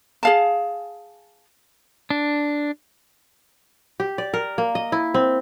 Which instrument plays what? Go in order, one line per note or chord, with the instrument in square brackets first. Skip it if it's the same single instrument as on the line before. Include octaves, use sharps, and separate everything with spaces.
[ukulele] G#4 F5 A5
[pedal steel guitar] D4
[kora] G4
D5
A#4
A#3
D#5
E4
C4